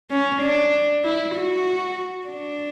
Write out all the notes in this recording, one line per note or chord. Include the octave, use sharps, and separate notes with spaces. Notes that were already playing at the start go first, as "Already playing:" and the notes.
C#4
D4
E4
F#4
D4